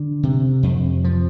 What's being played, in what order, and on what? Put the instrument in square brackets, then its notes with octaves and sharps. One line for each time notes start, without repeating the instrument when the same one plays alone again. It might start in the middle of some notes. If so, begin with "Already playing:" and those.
Already playing: [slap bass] D3
C3
F2
F3